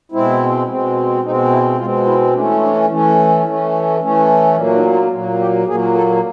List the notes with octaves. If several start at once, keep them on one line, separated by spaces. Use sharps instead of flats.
B2 G#3 C4 E4
B2 G#3 C4
B2 G#3 C4 D#4
E4
B2 G#3 C4 F4
E4
E3 A3 C#4 D4
D4
E3 A3 C#4
E3 A3 C#4
E3 A3 C#4
A#2 F#3 A#3 D4
D#4
F4
A#2 F#3 A#3
G4
A#2 F#3 A#3 G#4
A4